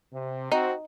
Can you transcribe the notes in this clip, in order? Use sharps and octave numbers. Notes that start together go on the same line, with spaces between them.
C3
C4 D#4 F#4